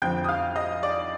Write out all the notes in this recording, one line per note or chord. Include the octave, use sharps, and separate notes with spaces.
F2 D3 F3 G5 G6
D#6
F5 F6
D#5 D#6
D5 D6